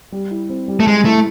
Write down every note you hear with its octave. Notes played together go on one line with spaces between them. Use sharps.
G3
E4
C4
G3
A3
G3 G#3
A3 E4